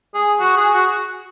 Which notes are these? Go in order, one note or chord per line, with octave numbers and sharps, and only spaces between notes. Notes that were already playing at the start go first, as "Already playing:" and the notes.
G#4
F#4
G#4
F#4